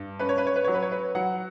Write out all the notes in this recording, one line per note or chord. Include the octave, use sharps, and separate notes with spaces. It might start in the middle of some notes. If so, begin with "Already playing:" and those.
Already playing: G2
C#4 B4
C#5
B4
C#5
B4
F#3 C#5
B4
C#5
B4
F#3 F#5